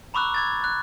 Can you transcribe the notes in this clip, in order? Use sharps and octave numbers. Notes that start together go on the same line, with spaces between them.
A#5 B5 C#6 D6 E6 F#6
D6 G#6 A6
F#6